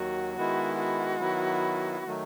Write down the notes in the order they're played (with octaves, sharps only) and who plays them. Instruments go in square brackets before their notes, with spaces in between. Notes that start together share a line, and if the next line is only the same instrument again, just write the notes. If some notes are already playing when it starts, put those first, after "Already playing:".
Already playing: [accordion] D#2 D#3 F#3 [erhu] F#4
[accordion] D#3 G#3 B3 E4 [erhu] F#4
[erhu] F#4
[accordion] D#3 F#3 B3 E4
D#3 F#3 A3